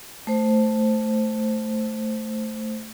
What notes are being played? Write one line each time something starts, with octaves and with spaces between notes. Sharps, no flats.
A3 C5